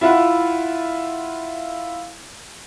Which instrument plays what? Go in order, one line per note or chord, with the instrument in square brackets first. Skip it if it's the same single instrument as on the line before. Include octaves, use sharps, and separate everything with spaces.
[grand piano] E4 F4 E5 F#5